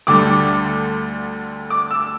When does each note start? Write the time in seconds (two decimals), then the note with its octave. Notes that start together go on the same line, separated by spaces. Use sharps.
0.07 D2 D3 G3 D6
1.70 D6
1.91 E6